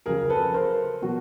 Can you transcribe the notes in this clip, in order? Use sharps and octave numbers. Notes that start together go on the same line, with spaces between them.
F2 C#3 F#3 G#4 A#4
A4 B4
A#4 C5
B2 F#3 F#4